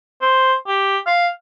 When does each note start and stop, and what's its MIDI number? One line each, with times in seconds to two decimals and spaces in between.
0.21 0.54 72
0.67 0.98 67
1.07 1.28 77